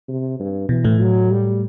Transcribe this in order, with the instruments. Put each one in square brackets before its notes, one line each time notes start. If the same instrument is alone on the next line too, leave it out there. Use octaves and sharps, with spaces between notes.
[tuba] C3
G2
[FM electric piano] B2 [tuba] E3
[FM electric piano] A2 A3
[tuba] F#3
G3